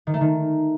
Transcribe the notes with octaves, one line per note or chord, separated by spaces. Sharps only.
D#3
A3
D#3